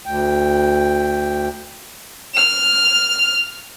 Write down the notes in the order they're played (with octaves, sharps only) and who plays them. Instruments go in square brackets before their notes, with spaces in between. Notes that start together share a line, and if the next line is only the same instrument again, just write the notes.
[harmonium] D2 G5
[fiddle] F6